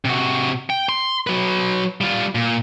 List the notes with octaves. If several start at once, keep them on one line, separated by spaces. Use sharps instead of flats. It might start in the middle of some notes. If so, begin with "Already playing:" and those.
C3 F#4
G5
C6
F#3 B4
G3 F4
A#2